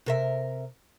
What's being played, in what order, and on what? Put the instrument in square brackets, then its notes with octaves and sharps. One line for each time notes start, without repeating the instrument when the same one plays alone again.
[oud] C3 A#4 E5